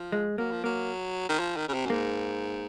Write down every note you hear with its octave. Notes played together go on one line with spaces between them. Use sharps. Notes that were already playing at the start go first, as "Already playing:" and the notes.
Already playing: F3
G#3
F#3 A#3
F3
F#3 A#3
D#3
F3
D#3
C#3
C3
F#2
G#2 A#3